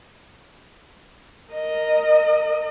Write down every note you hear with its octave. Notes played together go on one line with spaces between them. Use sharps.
A#4 D#5